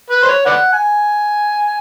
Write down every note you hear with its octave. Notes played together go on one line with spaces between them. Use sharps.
B4
C5
C#5
B4 D5 F#5
G#5